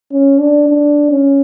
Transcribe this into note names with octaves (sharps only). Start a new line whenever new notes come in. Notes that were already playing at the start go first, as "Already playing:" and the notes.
C#4
D4
D4
C#4